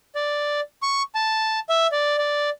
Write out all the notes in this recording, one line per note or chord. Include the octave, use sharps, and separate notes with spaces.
D5
C#6
A5
E5
D5
D5